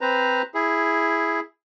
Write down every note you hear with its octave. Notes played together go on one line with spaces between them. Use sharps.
C4 B4 C5 A#5
E4 G#4